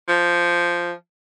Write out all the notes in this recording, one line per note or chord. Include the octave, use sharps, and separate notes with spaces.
F3